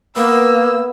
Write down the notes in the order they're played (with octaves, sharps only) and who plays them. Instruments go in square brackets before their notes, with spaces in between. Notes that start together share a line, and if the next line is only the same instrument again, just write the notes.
[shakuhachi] A#3 [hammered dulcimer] B3 [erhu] E6